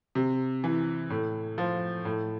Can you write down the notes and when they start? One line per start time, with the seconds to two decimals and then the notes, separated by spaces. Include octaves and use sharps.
0.15 C3
0.64 E3
1.10 A2
1.58 F3
2.05 A2